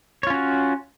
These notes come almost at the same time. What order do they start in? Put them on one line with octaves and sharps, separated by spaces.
C#5 F4 C#4 F#4